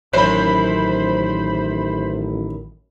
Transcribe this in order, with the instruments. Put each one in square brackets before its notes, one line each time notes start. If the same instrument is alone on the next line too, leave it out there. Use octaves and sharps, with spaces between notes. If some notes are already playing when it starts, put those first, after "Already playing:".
[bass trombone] A1 [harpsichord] F#2 [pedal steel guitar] D#3 E4 B4 [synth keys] C5 B5